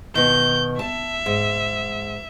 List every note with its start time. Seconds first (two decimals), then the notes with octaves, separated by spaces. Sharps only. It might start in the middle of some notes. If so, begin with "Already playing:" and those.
0.15 B2 D#3 G6
0.79 E5 A5
1.26 G#2